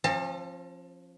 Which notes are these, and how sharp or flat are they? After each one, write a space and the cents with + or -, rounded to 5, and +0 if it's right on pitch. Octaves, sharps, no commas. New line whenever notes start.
F3 +0 C#4 -45 A5 +35